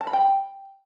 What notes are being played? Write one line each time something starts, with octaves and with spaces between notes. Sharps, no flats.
A5
B5
G5